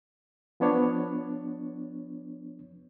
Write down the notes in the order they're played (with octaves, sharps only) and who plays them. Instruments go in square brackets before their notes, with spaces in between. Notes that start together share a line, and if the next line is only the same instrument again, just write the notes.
[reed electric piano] F3 B3 D4 C#5